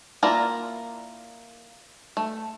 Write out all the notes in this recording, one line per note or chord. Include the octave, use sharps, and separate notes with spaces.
A#3 E4 F4 A#4 D5
A3